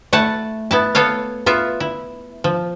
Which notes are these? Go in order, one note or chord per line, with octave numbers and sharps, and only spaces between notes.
A3 E4 F#5 A5
B3 E4 A5
B3 A4 C#5 F5
B3 F4 E5
E4
F3